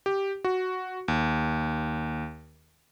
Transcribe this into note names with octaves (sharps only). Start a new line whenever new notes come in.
G4
F#4
D#2